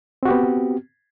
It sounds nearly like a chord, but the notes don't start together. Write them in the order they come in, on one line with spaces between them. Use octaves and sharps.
C4 F#4 G4 B3